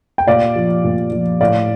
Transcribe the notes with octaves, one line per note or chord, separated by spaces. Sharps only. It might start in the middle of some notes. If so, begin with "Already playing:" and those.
G5
A#2 D5 F5
F3
A#2
F3
A2 D5 F5